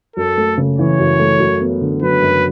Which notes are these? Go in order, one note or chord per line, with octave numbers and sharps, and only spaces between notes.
F#2 A4
A3
C#3
E3 C#5
F#2
A3
F#2
B3
D3
F#3 B4
F#2